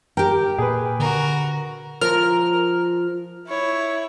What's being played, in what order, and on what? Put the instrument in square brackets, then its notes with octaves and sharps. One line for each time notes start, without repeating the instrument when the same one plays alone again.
[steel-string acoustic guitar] G4 G5 [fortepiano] A#4
[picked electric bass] A#2 [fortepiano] G#4 B4
[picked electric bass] D3 [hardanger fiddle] F#4 A#4
[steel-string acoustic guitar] F3 [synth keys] A#4 F6
[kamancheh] E4 C#5